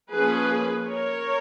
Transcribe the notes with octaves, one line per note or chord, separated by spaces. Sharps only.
F3 A#3 C#4 G#4 B4
A#4 C#5